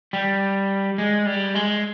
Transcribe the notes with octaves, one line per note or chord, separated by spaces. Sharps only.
G3
G#3
G3
G#3